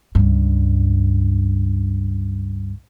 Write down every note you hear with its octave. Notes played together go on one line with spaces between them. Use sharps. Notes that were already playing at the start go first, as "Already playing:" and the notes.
C#2 G2